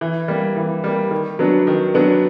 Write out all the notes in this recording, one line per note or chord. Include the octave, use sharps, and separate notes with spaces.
E3
G3 A#3
E3
G3 A#3
D#3
F#3 B3 D4
D#3
F#3 B3 D4